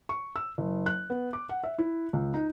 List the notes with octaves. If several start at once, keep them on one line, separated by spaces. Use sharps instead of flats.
C#6
E6
F#1
F#6
B3
D6
F#5
E5
E4
C#2
D#4